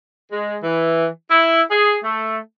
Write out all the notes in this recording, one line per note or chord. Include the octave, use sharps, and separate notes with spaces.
G#3
E3
E4
G#4
A3